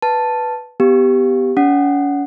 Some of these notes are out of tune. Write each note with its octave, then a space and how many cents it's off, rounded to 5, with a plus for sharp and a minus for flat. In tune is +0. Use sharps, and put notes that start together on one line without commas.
B4 +0 A5 +0
B3 +20 G4 +0
C#4 +40 F#5 +0